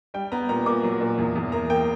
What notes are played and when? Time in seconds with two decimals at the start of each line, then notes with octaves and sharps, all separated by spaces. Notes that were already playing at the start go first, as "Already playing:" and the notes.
0.14 G3 G5
0.32 B3 A#5
0.49 A#2 A#5
0.66 A#2 D6
0.83 F#3
1.01 A#2
1.18 E2
1.36 E2
1.52 A#3 A#5
1.70 A#3 G5